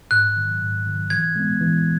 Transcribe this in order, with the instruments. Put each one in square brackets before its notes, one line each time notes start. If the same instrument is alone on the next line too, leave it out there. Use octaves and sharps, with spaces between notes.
[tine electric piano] G#2 [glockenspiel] F#6
[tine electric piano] D#3 F#3
G#2
D#3 F#3
[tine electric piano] E3 [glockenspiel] G#6
[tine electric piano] G#3 B3
E3